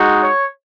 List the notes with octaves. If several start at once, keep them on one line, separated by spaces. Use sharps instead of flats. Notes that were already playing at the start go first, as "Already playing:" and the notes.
Already playing: G#3 D#4 F#4
C#5